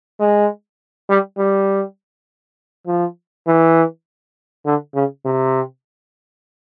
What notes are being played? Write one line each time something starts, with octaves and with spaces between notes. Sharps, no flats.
G#3
G3
G3
F3
E3
D3
C#3
C3